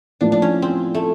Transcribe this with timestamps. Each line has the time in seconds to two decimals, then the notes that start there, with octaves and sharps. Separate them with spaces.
0.21 A2 F3 A#3 D4
0.32 D4
0.42 C#4
0.62 C4
0.95 A3